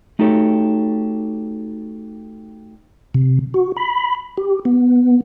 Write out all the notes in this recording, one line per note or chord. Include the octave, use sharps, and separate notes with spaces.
A3 D#4 F#4 G4 A4 C#5
C3
F#4
B5
G4
B3